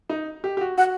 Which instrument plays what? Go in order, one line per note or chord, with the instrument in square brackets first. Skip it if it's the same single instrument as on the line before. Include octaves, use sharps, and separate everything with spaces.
[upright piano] D#4
G4
G4
F#4
[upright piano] F#4 [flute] F#5